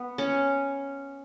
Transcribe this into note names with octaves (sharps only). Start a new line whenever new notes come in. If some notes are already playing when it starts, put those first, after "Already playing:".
Already playing: B3
C#4